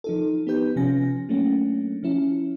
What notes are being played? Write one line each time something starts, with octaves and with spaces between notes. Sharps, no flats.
F3 D#4 A4
B3 D#4 G4 B4 G6
C3 F3 C#4 G#5 A#6
F#3 A3 A#3 C#4 D4
F3 C#4 E4